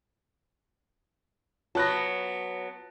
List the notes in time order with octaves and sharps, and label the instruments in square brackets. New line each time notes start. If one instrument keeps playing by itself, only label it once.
[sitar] F#3 B3 [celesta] F4 B5 [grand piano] A5 F#6 A#6